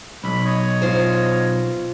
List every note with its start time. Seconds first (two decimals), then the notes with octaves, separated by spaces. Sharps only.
0.24 B1 B5
0.45 C#5 D#5
0.82 F4 C5